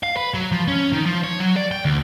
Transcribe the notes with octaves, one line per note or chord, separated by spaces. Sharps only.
F5
B4
F#3
F3
C#4
D#3
F3
C#5
F#3
D5
G5
D2